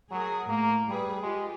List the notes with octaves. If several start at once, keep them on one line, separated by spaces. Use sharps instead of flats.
F#3 G#4 A#4
A2 A#3
G3 G#4 B4
G#3 F4 G4